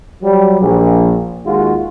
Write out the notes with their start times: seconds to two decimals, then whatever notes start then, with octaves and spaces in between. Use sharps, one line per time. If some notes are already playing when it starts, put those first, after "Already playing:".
0.22 F#3 G3
0.60 A#1
1.45 D#2 G#3 F4 F#4